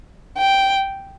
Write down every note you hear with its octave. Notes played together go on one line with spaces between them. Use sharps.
G5